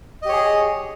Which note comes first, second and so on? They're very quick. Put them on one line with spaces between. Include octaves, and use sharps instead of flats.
D#5 G4 C#5 G#4